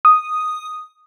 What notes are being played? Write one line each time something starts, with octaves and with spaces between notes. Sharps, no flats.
D#6